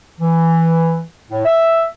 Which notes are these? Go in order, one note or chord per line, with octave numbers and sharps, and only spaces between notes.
E3
A2
E5